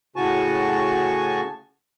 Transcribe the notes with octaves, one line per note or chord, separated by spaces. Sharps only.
A2 C#3 F#4 G#5 A5 C#6